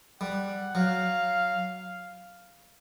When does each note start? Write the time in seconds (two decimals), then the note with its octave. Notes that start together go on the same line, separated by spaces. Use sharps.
0.21 G3 F#5
0.75 F#3 F5